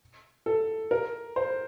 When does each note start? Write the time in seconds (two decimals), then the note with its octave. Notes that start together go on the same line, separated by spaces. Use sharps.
0.46 A4
0.91 A#4
1.36 C5